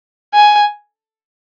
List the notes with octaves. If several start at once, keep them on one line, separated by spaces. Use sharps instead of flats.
G#5